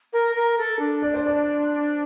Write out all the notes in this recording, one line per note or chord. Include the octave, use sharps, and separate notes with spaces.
A#4
A#4
A4
D4
D5
C5
D5